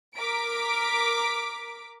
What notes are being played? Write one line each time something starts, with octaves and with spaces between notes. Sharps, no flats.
A#4 A#5 D6 B6 D7